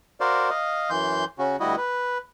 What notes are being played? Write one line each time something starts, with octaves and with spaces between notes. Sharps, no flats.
F#4 A#4 C5 D5 F5
D#5 F5
F#2 E3 C6 G6
C#3 C#4 F#4
D2 G3 E4 F#4 D#5
B4